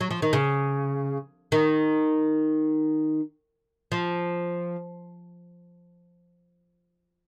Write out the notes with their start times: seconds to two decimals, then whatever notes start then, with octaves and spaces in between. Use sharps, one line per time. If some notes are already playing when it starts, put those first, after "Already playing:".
0.01 F#3
0.11 F3
0.22 D#3
0.33 C#3
1.52 D#3
3.92 F3